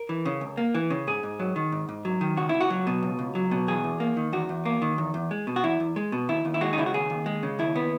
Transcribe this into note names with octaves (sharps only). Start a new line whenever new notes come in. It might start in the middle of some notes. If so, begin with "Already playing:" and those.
Already playing: A#4
E3
C#3
C#2
A#3
E3
C#3
G#2 G#4
G#2
F#3
D#3
G#2
G#2
F#3
D#3
C#2 F#4
C#2 E4
F#4
F#3
B2
C#2
C#2
F#3
B2
E2 G#4
E2
A#3
D#3
E2 F#4
E2
A#3
D#3
E2
E2
G#3
B2
F#4
E2 E4
E2
G#3
B2
D#2 E4
D#2
E4
G#3 F#4
D#4
C#3 E4
F#4
D#2 G#4
D#2
G#3
C#3
D#2 E4
B3